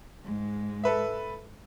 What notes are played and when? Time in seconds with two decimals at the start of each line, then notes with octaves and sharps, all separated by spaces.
0.24 G#2 G#3
0.84 A4 B4 E5